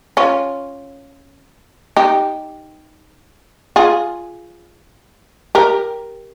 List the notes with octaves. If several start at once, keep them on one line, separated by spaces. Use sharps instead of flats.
C#4 F4
D#4 G4
F4 G#4
G4 A#4